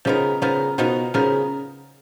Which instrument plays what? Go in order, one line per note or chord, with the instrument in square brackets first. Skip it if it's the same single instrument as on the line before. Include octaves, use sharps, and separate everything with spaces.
[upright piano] C#3 [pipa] F3 B3 D#4 A#4
[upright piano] C#3 [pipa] F3 B3 D#4 A#4
[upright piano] B2 [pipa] F3 B3 D#4 A#4
[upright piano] C#3 [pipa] F3 B3 D#4 A#4